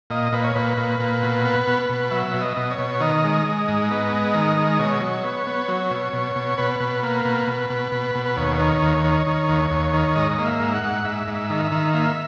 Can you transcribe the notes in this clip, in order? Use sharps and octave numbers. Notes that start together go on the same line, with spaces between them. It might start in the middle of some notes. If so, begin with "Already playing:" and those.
A#2 D#5
A#2 B4
C#5
A#2 B4
A#2
A#2
B2
B3
B2
B2
F#3 E5
B2
D#5
B2
C#5
B2
D#3 D#5
G#3
G#3
G#2
B3
G#3
D#3
G#3
B2 C#5
F#3
B3
B3
F#3
B2
B2
B2
B2 B4
B2
A#3
B2
B2
B2
B2
B2
B4
D#2 C#5
D#3
D#2
D#3
D#3
D#2
D#2
D#3
G#2 D#5
A#3
E5
G#2
F#5
G#2
G#2 E5
G#2
E5
D#3
E5
D#3
A#3 E5